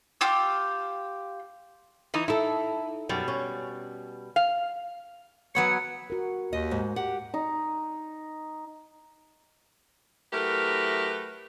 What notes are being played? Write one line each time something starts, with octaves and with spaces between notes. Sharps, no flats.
F4 G4 E6
E3 D#4
D#4 E4 A4
F#2 B2 G3
C#4
F5
F#3 B3 C#5 C#7
F#4 A#4
D#2 D#5
G#2
G4 F#5
D#4
F#3 A3 E4 G4 A#4 B4